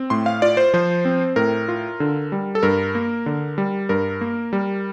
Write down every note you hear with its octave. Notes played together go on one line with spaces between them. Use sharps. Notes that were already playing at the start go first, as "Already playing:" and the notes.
Already playing: C4
A2 C6
F5
F4 D5
C5
F3 C5
C4
A2 A#4
F4
D3
G3
A4
G2 A#4
A#3
D3
G3
G2 A#4
A#3
G3